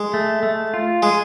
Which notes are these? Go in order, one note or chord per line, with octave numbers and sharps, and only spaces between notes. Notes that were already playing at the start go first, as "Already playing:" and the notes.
Already playing: G#3
A3
A3
F4
G#3 G#4